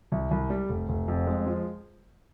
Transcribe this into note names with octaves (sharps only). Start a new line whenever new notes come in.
C2
C2
G3
F1
F1
F2
G#3
F3